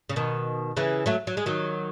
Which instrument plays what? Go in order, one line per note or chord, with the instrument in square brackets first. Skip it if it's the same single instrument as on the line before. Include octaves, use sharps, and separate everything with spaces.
[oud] C#3
B2 D#3
C#3 E3
F#3 A3
F#3
G#3
D#3 F#3